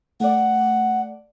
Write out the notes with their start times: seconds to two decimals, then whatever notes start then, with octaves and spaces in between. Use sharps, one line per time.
0.20 A3 D5 F#5